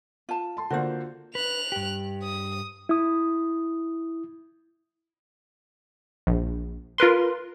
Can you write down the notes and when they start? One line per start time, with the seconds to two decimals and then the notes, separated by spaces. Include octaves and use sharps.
0.29 F4 A5
0.57 A5 C6
0.70 D3 A#3 F4 F#4 C5
1.35 B4 F#6 F7
1.72 G2 G4
2.23 D#6
2.89 E4 D#6
6.27 A#1
6.98 F4 A#4 B4 C6